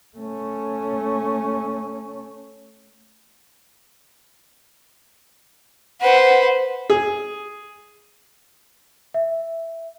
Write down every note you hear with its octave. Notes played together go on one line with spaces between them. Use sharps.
A3 C#4
B4 C5 F#5
G#4
E5